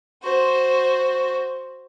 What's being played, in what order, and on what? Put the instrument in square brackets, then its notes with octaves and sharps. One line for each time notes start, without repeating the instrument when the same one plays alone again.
[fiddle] F#4 C5